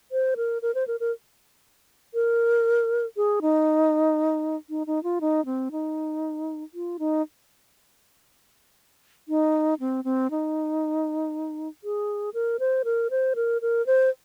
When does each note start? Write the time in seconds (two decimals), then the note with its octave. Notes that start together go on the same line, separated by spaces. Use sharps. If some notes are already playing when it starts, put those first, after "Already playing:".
0.12 C5
0.37 A#4
0.62 A#4
0.75 C5
0.88 A#4
1.00 A#4
2.14 A#4
3.17 G#4
3.42 D#4
4.70 D#4
4.87 D#4
5.03 F4
5.21 D#4
5.46 C4
5.72 D#4
6.74 F4
6.99 D#4
9.28 D#4
9.80 C4
10.04 C4
10.31 D#4
11.84 G#4
12.34 A#4
12.60 C5
12.85 A#4
13.11 C5
13.36 A#4
13.62 A#4
13.87 C5